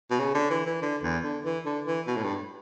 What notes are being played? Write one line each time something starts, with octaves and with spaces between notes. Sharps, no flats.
B2
C#3
D3
E3
E3
D3
E2
D3
E3
D3
E3
B2
A2
G2